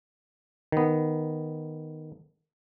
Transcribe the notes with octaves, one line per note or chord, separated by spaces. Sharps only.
D#3 B3